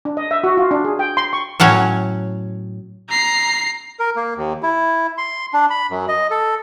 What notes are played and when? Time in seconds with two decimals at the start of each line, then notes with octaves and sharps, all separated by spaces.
0.05 D4
0.17 D#5
0.31 E5
0.44 F#4
0.57 F4
0.71 D4
0.85 G#4
0.99 G5
1.17 C6
1.33 C#6
1.60 A2 F#3 C#4 C#5
3.09 A#5 C7
4.00 A#4
4.16 A#3
4.36 D#2
4.63 E4
5.18 C6
5.54 D4
5.70 B5
5.90 F#2
6.09 D#5
6.30 A4